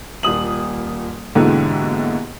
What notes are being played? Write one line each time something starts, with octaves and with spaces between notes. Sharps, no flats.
D#1 A#2 D#6 F#7
D#2 G#2 B2 D3 E3